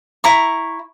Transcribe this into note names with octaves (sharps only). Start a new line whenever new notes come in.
E4 A#5 C#6